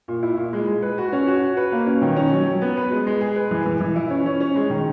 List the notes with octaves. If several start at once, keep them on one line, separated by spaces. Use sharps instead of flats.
A#2
E4
A#2
G#3
G#3
B4
F#4
C#4
F#4
F#4
B4
A#3
C#4
D#3
C#4
F#3
F#3
B3
B4
G#3
G#3
G#4
B4
E3
E3
E3
E4
C#4
C#4
C#4
G#3
D#3